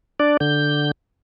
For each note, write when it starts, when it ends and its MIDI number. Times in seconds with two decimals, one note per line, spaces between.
0.20 0.37 62
0.20 0.37 74
0.40 0.91 50
0.40 0.91 91